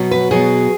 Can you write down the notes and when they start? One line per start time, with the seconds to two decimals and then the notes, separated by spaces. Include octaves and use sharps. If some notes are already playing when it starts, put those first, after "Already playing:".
Already playing: B2 F#3 B3
0.11 B4
0.31 B2 F#3 B3 G#4